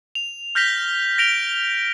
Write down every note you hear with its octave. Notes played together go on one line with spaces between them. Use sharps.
F7
F6 G6 A#6 B6 F7 G7
A#6 D7 F7 G7